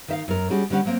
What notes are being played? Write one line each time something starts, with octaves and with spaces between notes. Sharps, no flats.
D#3 E5 F5
F#2 A#4
G3 C#4 F#4 G#4
D3 G3 C#4 F#5
F#3 A#3 C4